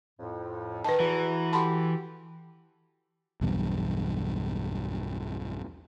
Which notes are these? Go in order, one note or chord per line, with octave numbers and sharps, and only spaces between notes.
F2 A2
D#3 B4 A5
E2 E3 F#4 A#5
F#4 G4 A4 A5 B5 C6
B1 E2 G2